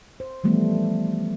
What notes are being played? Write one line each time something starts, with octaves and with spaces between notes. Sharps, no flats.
C5
E3 F3 G3 A3 B3